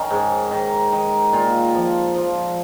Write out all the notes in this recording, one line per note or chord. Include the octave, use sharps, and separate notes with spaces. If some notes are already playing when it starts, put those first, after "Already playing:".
Already playing: D#3 C#4
G#2
D#3
D#3
A#2 F4
F3
F3